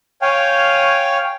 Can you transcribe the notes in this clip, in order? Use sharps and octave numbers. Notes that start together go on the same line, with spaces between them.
C#5 F5 G5 G#5